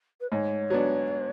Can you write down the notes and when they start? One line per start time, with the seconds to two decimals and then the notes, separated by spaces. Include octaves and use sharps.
0.21 B4
0.31 G#2 C#5
0.70 F#3 B3 D4